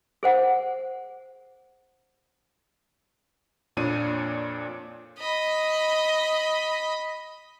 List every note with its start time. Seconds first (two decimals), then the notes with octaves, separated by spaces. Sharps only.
0.23 G#4 C5 F#5
3.77 F2 A#2 D4 C#5 D5 D#7
5.18 D#5 B5